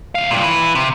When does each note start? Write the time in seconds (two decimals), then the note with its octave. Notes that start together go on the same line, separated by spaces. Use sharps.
0.15 D2 F5
0.31 G2 A#2
0.43 E3
0.75 C3